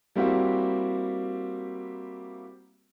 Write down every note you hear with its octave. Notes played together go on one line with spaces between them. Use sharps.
G3 A#3 C4 E4 F#4 G4